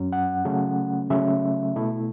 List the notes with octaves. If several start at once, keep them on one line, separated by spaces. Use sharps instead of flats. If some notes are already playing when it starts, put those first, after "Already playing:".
Already playing: F#2 F#3 C#4
F#5
C#3 F#3 A3 C#4
C#3 F#3 A3 C#4 E5
B2 A3 E4